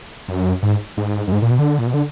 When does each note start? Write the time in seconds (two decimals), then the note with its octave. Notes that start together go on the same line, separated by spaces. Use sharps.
0.28 F#2
0.63 G#2
0.97 G#2
1.28 F#2
1.32 G#2
1.42 A#2
1.51 B2
1.59 D3
1.79 A#2
1.87 B2
1.94 D3